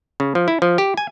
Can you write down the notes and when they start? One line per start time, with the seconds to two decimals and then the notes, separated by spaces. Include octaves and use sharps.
0.20 C#3
0.35 F3
0.48 E4
0.62 F3
0.78 G4
0.97 G#5